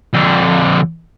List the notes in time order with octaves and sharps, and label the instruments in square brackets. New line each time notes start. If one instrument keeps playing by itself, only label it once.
[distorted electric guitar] F2 D3